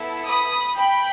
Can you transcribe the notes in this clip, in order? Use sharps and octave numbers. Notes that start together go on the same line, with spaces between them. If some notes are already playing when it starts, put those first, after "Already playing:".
Already playing: B3 E4 A4
B5 D#6
G5 B5